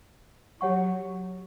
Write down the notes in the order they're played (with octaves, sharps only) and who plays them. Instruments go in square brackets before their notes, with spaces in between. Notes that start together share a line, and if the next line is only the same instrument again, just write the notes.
[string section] F#3 [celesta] G4 C#5 F#5 C#6